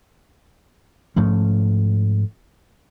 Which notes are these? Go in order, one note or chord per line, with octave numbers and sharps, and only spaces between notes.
G#2 F3 A3 C#4